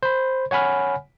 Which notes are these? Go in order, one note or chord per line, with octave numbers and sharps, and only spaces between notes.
C5 B5
C#5 F#5 G#5 B5 F6